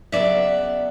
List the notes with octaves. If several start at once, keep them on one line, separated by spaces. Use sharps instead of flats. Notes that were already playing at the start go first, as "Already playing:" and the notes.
C#3 F#3 B3 D5 E5